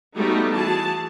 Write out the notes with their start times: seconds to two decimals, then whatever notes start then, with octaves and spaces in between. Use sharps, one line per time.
0.16 G3 A3 B3 D#4 F#4 G4
0.52 E3 F#4 G#4 A5